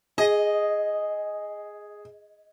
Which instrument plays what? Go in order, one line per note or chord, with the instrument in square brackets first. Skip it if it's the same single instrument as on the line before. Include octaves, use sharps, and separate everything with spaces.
[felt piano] G#4 [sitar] D#5